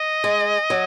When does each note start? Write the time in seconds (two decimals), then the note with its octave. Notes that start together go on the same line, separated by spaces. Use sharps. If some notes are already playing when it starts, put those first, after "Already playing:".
Already playing: D#5
0.24 G#3
0.70 F#3